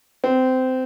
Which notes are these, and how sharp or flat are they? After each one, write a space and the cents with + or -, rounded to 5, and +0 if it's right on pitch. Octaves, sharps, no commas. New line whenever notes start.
C4 -20